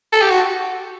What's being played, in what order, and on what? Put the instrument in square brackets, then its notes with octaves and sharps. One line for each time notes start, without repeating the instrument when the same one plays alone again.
[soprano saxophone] A4
G4
F#4